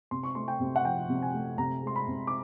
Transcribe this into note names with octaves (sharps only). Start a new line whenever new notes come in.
C3 C6
C#6
A3 C6
G5
C3
F#5
F3 G5
C3
G#5
A3
C3 A#5
G#3 C6
B5
C3
D6